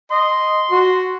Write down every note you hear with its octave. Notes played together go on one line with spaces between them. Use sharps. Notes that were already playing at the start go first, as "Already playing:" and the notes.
D#5 C6
F#4